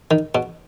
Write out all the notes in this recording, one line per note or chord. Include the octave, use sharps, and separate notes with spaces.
D#3
B2